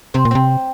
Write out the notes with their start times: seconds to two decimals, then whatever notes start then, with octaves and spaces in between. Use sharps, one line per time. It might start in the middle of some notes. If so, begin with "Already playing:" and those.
0.14 C3 C4
0.25 A#2
0.31 C3 C4